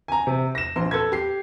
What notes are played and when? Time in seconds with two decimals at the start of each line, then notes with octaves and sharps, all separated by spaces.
0.08 G#5 A#5
0.27 C3
0.55 A#6 E7
0.76 A#1 C6
0.91 A4 B4 G#6
1.12 G4 C7